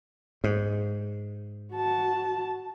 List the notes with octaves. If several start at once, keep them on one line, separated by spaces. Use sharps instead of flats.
G#2
F#4 A5